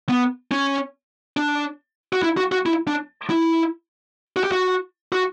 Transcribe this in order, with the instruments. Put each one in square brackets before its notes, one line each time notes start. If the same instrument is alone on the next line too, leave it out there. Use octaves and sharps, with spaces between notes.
[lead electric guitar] B3
C#4
D4
F#4
E4
F#4
F#4
E4
D4
E4
F#4
G4
F#4
F#4